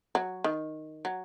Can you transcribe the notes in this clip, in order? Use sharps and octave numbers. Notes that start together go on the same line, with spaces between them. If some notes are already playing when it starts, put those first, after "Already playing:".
F#3
D#3
F#3